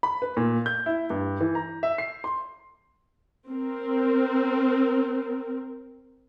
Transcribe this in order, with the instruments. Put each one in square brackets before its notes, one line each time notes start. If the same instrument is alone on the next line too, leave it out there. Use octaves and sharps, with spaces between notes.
[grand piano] B5
B4
A#2
G6
E4
G2
E3
A#5
E5
C7
C6
[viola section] C4 A#4